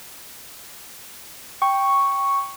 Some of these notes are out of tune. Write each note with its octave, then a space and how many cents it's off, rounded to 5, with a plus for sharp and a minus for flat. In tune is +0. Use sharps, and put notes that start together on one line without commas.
G5 +0 C#6 +0